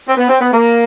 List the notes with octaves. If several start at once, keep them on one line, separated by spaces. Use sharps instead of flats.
C4
B3
C4
B3
A#3